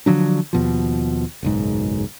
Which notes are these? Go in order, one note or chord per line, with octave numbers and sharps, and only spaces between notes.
D3 F3 F#3 D4
D#2 B2 F3
F#1 B1 G#2